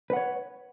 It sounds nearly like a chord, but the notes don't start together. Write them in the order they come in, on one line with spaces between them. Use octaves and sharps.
B4 F#5 C#5